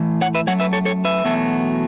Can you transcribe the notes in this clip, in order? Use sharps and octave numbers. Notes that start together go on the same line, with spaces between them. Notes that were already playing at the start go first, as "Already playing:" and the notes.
Already playing: A2 E3
C#5 F#5
B4 E5
F#2 F#3 A3 C#5 F#5
B4 E5
A4 C#5
A4 C#5
B4 E5
E2 B2 F#3 A3